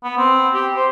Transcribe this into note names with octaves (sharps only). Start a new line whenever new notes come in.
B3
C4
G4
C5